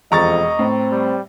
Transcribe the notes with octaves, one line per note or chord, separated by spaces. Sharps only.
E1 F2 D#5 A#5 C#6 A6
A2 C4
G3